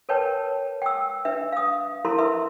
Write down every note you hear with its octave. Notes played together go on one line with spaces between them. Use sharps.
A#4 B4 C#5 G5 A5
G5 E6
D4 B4 E5
F5 D#6
E4 A4 A#4 A#5 C6
B4 E5 C6